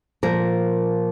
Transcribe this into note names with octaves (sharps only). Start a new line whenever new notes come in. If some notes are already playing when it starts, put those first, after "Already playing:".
A#2 F3 A#4